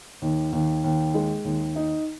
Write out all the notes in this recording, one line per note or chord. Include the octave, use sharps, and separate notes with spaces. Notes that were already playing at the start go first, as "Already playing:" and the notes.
D#2
D#2
D#2
G#3
D#2
D#4